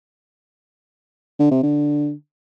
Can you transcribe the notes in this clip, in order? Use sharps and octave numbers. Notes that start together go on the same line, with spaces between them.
D3
C3
D3